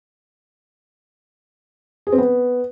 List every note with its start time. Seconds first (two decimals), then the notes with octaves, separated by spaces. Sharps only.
2.07 G#4
2.12 C4
2.18 B3